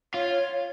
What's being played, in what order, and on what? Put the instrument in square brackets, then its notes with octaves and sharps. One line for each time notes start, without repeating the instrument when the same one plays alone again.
[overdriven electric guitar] F4 [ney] C#5